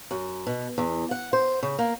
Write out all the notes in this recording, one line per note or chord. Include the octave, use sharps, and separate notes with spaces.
F#2
B2
E2
F#5
C5
C#3
A#3